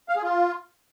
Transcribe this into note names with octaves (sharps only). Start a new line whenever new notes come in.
F5
G#4
F4